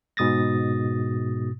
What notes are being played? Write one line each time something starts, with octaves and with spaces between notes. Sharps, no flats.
G#2 B2 D#6 A6 A#6